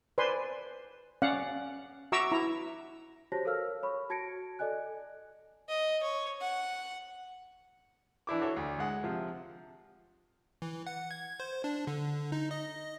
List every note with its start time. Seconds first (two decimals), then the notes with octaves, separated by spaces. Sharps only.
0.18 B4 C5 D5 G#5 C6
1.22 C#4 D5 F5 F#5
2.12 F#4 E5 A#5 C#6 D6 E6
2.32 E4 A#5
3.32 F#4 G4 C5 C#5 A5 A#6
3.45 A4 A#4 C#5 F5 E6 F6
3.83 C#5 B5 C#6
4.10 F#4 A5 G#6 A#6 C#7 D7
4.59 A4 D5 D#5 G#5 F#6
5.69 D#5
6.03 C#5
6.41 F#5
8.27 E3 D4 E4 D6
8.41 F#4 A4 C#5
8.56 D2
8.79 G#3 F#5
9.04 C3 F3
10.62 E3
10.87 F#5
11.11 G#6
11.40 C5
11.64 D4
11.87 D3
12.32 D#4
12.51 D#5